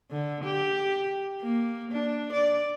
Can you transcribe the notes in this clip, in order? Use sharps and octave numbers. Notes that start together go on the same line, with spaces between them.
D3
G4
A#3
D4
D5